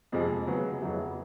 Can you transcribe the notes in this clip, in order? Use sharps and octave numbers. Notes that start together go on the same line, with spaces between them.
F2 C3 F3 G#3
C#3 F#3 B3
F2 C#3 F#3 B3 E4